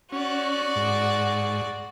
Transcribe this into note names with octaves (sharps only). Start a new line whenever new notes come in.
C#4 F#4 D5
G#2